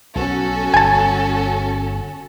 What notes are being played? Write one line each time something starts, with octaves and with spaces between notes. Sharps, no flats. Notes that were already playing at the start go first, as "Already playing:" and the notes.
B1 C#4 F#4 A4
G1 G#5 A5